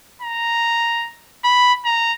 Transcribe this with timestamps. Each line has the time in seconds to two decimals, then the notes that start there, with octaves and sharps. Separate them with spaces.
0.22 A#5
1.44 B5
1.85 A#5